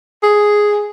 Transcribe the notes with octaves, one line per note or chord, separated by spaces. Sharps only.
G#4